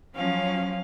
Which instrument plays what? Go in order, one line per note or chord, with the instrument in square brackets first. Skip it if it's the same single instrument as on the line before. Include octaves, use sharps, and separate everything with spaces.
[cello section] F3 F#3 C#4 [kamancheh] F5